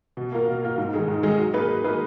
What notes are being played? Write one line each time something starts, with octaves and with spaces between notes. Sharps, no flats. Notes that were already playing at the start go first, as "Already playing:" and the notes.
B2
A#3 F4 A#4
B2
A#3 F4 A#4
G#2
D#3 G#3 D#4 G#4
G#2
D#3 G#3 D#4 G#4
F#3
A#3 D#4 G#4 B4
F#3
A#3 D#4 G#4 B4